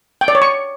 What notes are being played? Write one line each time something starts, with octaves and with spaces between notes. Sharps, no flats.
G5
D5
C#5
C#6